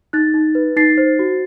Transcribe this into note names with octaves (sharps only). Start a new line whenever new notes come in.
D#4 F#6 A6
D#4
B4
D#4 A6 C7
C5
F#4